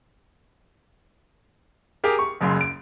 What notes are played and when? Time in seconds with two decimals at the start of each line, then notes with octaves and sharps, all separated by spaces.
2.04 G4 G#4 A#4
2.19 C#6
2.41 F#1 C#2 F#2 C6
2.61 D7